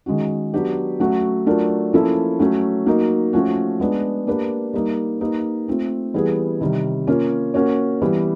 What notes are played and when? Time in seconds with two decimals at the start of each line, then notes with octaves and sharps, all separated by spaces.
0.06 D#3 G#3 C#4 F#4
0.54 F#3 B3 D4 G4
1.00 F#3 A3 C#4 F#4
1.46 F#3 A3 D4 F4 A#4
1.93 F3 A#3 C#4 E4 A4
2.39 F#3 A3 C#4
2.86 F#3 A#3 D#4
3.33 F3 A3 C#4 F#4
3.80 G#3 B3 D4
4.27 A#3 D4 G4 B4
4.74 G3 A#3 D#4
5.20 A#3 D#4 G4 B4
5.68 A3 C4 F4
6.14 E3 G3 B3 E4 G#4
6.61 C3 D#3 G3
7.07 A#3 C#4 F4 A#4 C#5
7.54 A#3 C#4 F#4 A#4 C#5
8.02 E3 G3 B3